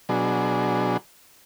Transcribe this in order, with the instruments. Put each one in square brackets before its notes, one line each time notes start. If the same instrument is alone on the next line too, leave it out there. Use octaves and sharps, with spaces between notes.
[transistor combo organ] B2 F#3 D4 G#4